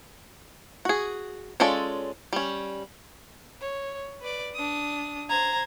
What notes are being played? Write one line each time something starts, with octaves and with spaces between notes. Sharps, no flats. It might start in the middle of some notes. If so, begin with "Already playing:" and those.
F#4 G#4
G#3 C#4 F4 A4 D5
G3 C#4
C#5
B4 D5
D4 D#6
C5 A#5 G#6